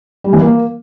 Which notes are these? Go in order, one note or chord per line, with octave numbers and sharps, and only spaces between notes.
G3
E3
A#3